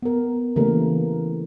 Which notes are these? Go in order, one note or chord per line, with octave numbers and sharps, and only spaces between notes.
B3 A#4
C#3 E3 A3 A#3 G4 A#4